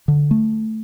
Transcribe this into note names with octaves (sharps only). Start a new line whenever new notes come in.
D3
A3